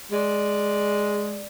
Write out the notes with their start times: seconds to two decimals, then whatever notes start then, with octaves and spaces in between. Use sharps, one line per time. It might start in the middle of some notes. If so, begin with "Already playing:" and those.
0.12 G#3 D5